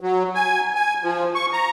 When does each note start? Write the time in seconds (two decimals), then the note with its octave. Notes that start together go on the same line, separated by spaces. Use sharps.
0.01 F#3
0.35 G#5
0.75 G#5
1.04 F3
1.35 C#6
1.53 A#5